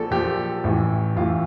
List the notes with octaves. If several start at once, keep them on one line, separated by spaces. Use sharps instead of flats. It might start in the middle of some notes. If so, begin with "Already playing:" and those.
Already playing: A#1 A#2 F3 A4
A#1 A#2 F3 G4
A1 A2 E3
A1 A2 E3 F4